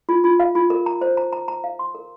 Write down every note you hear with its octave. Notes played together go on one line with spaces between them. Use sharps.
F4
F4
F5
F4
A#4
A#5
C5
A#5
A#5
A#5
F5
C6
A#4